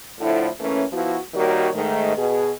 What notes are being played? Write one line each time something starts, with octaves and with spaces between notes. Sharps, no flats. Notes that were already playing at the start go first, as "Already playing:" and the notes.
A2 D3 F3 E4
E3 A3 A#3 C#4
F3 B3 E4 F#4
D#3 G3 A#3 F#4 C#5
G#2 D#3 A3
B2 G#4